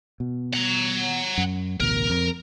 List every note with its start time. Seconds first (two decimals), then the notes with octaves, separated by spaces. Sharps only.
0.20 B2
0.54 F#5 A#5
1.38 F#2
1.80 A1 D2 B2 A#4
2.10 F2